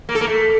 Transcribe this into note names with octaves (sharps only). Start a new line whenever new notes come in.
A#3
A4
A#3
A3